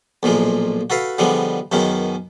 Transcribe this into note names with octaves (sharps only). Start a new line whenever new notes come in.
B1 A#2 F3 G#3
F#4 A4 B4 F5
D3 F3 G3 G#3 B3
F#2 B2 D#3 G#3 C#4